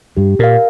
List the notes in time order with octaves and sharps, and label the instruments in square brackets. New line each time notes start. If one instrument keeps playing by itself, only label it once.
[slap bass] G2 [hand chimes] G4
[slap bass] A#2 [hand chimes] A#4 D5 F5